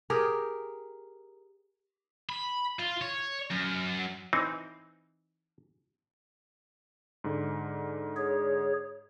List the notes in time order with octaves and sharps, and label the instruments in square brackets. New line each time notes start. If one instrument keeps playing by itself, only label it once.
[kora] G4 G#4 A#4
[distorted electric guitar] B5
F4
C#5
F#2
[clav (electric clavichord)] E3 C4 D#4
[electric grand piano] G#2 D3
[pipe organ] G#4 C#5